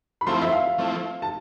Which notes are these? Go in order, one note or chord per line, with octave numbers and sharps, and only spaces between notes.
B5
F3 A3 C4 E4 C6
E5
F5
F3 A3 C4 E4
A5